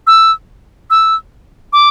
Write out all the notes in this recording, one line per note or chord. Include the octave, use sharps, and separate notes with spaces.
E6
E6
D6